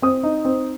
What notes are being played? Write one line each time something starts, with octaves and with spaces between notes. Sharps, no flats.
C4 D#6
D#4
C4